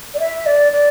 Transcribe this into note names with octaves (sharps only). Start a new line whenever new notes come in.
D5
E5
D5
D5